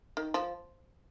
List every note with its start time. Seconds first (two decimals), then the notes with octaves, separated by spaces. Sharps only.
0.17 D#3
0.34 F3